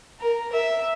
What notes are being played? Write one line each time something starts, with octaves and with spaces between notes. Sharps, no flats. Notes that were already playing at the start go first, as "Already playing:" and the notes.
A#4
E5